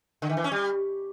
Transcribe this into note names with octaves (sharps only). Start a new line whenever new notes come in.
D3
D#3
E3
C#4
G3